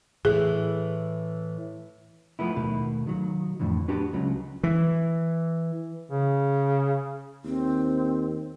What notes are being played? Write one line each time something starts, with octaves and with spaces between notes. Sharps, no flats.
A2 E3 G#4
F3 A3 B3 E4
D#2 B2 D#3 A3
D#3 F#3
F2 A2 D3 E3
B3 D4 F#4 G4
C#2 C#3 F#3
E3
C#3
D#2 C4